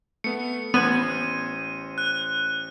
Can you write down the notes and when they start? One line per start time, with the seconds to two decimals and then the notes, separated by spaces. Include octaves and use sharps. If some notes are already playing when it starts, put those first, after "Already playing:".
0.24 A3 B3 C#7
0.74 A1 B3 C5 G#6 D#7
1.98 F#6